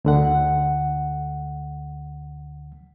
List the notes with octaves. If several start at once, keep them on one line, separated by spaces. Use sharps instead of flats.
D2 D3 F#5